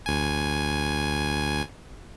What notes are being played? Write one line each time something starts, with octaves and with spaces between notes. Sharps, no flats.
D2 G#5